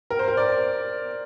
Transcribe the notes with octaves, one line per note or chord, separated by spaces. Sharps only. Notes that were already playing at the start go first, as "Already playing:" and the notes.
A#4
C5
A#4
D5